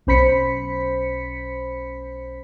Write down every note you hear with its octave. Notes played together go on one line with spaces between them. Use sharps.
B1 C#4 C5 B5 B6 C#7